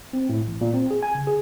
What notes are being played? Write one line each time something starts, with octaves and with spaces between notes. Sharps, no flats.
C4
A2
A1
A#2
C4
G#4
G#5
C#3
G#4